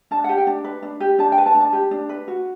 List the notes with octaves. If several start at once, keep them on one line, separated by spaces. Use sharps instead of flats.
D4 A5
G4 F#5
G5
D4
B4
D4
G4
D4 A5
G5
B4
A5
D4
A5
G4
D4
B4
F#4